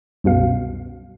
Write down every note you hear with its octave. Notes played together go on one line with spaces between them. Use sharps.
C2 F#2 B2 F5